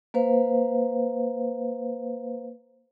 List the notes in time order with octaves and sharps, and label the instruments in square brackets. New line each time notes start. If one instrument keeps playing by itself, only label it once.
[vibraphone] A#3 B4 C5 F5